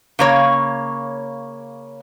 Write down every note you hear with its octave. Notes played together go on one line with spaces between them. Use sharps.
C#3 A#3 C#5